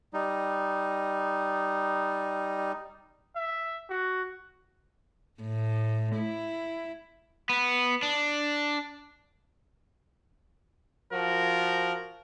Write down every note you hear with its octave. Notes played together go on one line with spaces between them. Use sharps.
G3 D#4
E5
F#4
A2
E4
B3
D4
F3 F#4 A#4